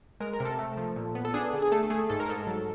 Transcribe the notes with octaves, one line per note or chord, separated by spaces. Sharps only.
G#3 A#4
A#4
C3
A4
A3
F3
A#2
B3
A4
D4 G#4
D3
G#4
A3 A4
A3 G#4
G#2 A4
A#4
G#2 A4
F#3